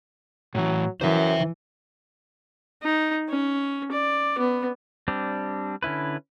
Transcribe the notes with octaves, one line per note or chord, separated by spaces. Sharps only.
A2 E3 F#3
F#2 E3 C5 E5
D#4
C#4
D5
B3
G3 C4 D4
D3 C#4 E4 B4